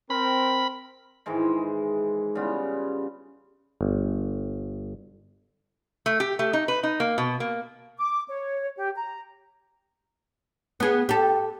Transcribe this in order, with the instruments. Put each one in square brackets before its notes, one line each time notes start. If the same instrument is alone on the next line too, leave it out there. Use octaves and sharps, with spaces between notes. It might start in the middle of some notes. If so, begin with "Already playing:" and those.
[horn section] C4 A#4 [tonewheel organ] B5
[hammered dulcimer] G#2 D#3 E3 G#3
C#3 G3 B3 F4
[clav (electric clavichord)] G1
[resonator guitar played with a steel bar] A3
G4
A3
D#4
B4
D#4
A#3
B2
A#3
[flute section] D6
C#5
G4
A#5
[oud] B3 G#4
G4 A4